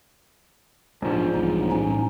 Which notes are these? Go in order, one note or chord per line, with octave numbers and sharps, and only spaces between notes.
E1 A#1 G#2 F3 D4
B1 E2 G2 D#4
A2 C#4 D#4